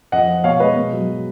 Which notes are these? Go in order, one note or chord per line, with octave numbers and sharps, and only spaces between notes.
F2 D#5 F#5
F3
B2 C#5 F5
G#3 B4 D#5
B2
F#3